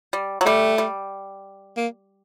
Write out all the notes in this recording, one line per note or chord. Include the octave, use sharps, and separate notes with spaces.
G3
F#3
G3 A3
G3
A#3